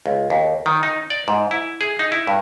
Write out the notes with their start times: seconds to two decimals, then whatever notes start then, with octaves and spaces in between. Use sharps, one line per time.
0.06 C#2
0.30 D#2
0.66 D#3
0.83 D#4
1.10 D5
1.28 G#2
1.51 E4
1.81 G#4
1.99 D#4
2.12 E4
2.27 G2